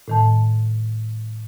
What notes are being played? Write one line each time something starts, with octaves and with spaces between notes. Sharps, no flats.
A2 D#3 A5